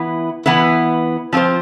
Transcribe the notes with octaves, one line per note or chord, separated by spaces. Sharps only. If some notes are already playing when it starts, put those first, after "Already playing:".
Already playing: E3 B3 E4 B4
E3 B3 E4 B4
F3 C4 F4 C5